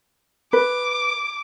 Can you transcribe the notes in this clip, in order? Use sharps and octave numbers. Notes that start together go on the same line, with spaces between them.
B4 D6